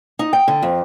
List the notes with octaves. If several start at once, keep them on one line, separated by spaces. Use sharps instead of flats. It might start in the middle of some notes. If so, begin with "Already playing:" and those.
D#4
G5
D3
F2